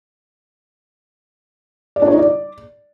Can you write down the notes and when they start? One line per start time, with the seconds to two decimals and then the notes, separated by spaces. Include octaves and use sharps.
1.96 D5
2.02 D4
2.08 C#5
2.13 D#4
2.19 D5